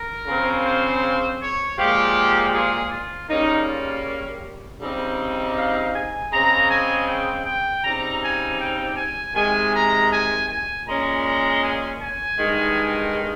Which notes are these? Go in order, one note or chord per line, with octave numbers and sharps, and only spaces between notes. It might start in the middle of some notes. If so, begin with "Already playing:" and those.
Already playing: A#4
C#3 F3 C4
C5
C#5
A#2 F3 G#3 G4
G#4
F4
C#3 G3 A#3 C#4 D#4
F4
C#3 G3 C4 D#4
F5
G#5
C#3 G#3 C4 A#5
G#5
G5
G5
C#3 G3 C4 D#4 A#5
G#5
G5
G#5
C3 D#3 G#3 G#5
A#5
G#5
G#5
A#2 G#3 C#4 A#5
A#5
G#5
G#5
G2 D#3 G#3 D#4